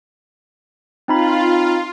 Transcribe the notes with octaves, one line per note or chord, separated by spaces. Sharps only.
C4 D#4 F4 B5